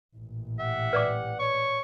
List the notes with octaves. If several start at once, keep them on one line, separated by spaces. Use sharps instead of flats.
A1 A#2
G4 E5 F#5
B4 D5 D6
C#5 C#6